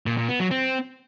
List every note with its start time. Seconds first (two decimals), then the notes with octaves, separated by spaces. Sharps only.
0.06 A#2
0.17 A#2
0.29 B3
0.40 F#3
0.51 C4